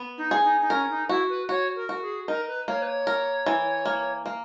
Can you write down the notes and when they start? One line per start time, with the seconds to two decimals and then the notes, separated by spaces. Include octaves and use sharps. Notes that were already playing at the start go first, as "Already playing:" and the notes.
Already playing: B3
0.18 D#4
0.31 G#4
0.44 D#4
0.61 D#4
0.70 C#4 A#4
0.90 D#4
1.09 E4 F#4
1.29 B4
1.49 F#4 C#5
1.76 A#4
1.89 F#4
2.01 G#4
2.27 D#4 A#4
2.48 B4
2.68 A#3 C#5
2.82 B4
2.87 C#5
3.07 A#4
3.46 E3
3.85 A#3
4.26 A#3